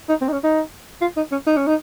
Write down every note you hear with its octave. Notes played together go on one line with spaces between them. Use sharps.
D#4
C4
D#4
C#4
D#4
F4
D#4
C#4
D#4
C#4
D#4